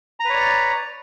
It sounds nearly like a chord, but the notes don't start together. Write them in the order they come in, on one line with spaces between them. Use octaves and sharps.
A#5 B4 C#5 D5